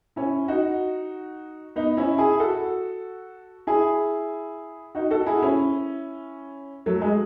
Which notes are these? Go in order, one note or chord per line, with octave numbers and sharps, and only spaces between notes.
C#4 E4
D#4 F#4
B3 D#4
C#4 E4
E4 G#4
F#4 A4
E4 G#4
D#4 F#4
F#4 A4
E4 G#4
C#4 E4
F#3 A3
G#3